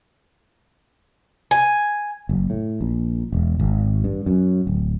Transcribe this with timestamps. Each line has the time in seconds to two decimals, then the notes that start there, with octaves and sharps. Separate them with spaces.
1.51 G#5
2.29 F#1
2.50 A2
2.81 A#1
3.32 E1
3.59 G#1
4.04 G2
4.26 F#2
4.67 D1